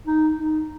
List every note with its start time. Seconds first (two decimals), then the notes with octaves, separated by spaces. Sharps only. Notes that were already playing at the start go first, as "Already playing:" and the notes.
0.07 D#4
0.38 D#4